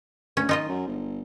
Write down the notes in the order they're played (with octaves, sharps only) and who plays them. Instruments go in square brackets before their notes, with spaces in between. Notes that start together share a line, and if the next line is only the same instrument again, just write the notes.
[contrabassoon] D2 [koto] C#4
[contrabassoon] D#3 [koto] D#4 F4 D#5
[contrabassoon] F#2
G1